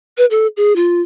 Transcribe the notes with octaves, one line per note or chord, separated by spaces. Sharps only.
B4
A4
G#4
F4